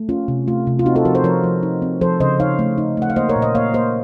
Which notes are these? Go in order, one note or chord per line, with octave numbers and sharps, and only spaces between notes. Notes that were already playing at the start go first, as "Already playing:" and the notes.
Already playing: A3
C#4 F4
C3
A3 F4
C3
F4
C4 D#4 F#4
F4 A4
F3 F#4 A#4
A4 C5
F3 A#4 C#5
F3
D#4
C4
F3 A4 C5
C#3 C5 D#5
D#4 C#5 F5
A3
D#4
A3 F#5
F5
A#3 C5 D#5
A#4 C#5
A#2
C5 D#5
A#3 C#5 F5
A#3 C5 D#5